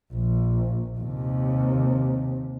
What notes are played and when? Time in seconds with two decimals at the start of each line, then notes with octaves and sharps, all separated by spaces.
0.13 A#1
0.99 D#2 C3